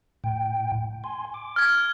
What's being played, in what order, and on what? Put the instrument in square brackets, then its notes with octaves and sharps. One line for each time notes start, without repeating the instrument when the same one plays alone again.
[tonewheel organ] A2 G5
G#5 C6
D6
[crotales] F6 G#6